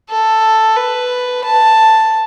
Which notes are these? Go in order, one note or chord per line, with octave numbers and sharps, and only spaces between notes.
A4
B4
A5